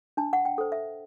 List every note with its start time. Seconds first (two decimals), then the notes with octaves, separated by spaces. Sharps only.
0.17 D4 A5
0.33 F#5
0.45 G5
0.58 A4 C5
0.72 E5